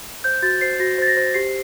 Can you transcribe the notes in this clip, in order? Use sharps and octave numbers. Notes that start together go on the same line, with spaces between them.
C5 G6
F#4 A6
C5 C7
F#4 A#6
C5 A6
A#6
C5
G4 C7